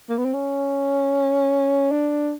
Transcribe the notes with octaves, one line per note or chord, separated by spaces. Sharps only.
A#3
B3
C4
C#4
D4